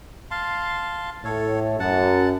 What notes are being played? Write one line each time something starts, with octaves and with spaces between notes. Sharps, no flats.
F5 A5 C6
A2 A4 C#5
F#2 F#5 A5